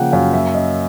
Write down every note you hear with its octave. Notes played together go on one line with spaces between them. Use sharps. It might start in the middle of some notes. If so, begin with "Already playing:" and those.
Already playing: C#3 F3 A#3 F#5 G5
F#2 F5
A#3 E5
C#4 D#5